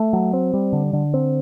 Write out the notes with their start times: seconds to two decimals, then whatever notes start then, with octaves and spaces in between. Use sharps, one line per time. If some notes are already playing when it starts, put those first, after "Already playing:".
Already playing: A3
0.13 F#3
0.33 C4
0.54 G3
0.73 D3
0.93 D3
1.14 C4